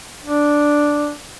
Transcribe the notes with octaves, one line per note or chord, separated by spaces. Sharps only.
D4